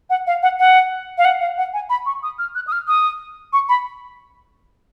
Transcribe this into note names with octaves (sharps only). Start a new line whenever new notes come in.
F#5
F5
F#5
F#5
F5
F#5
F5
F#5
G#5
B5
C#6
D#6
F6
F#6
D#6
F6
D#6
C#6
B5